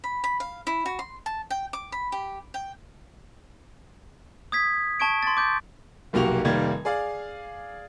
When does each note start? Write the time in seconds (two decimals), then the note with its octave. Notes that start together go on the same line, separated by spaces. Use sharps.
0.04 B5
0.24 B5
0.40 F5
0.67 E4
0.86 F#4
0.99 C6
1.26 A5
1.50 G5
1.73 D6
1.92 B5
2.12 G4
2.54 G5
4.52 D#6 G#6 B6
5.00 A5 C#6 G#6 D7
5.23 C6 A6
5.37 D6 G6 A6
6.13 F1 B1 A#3 F#4 G4 F7
6.44 F1 D#3 G3 A#3 G#6
6.85 G#4 D5 F5